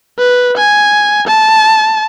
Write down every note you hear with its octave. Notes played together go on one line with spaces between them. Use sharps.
B4
G#5
A5